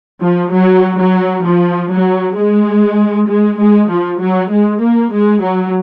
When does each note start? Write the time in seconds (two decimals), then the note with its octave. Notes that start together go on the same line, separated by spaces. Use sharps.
0.22 F3
0.52 F#3
0.99 F#3
1.45 F3
1.91 F#3
2.36 G#3
3.28 G#3
3.59 G#3
3.89 F3
4.20 F#3
4.51 G#3
4.81 A#3
5.13 G#3
5.43 F#3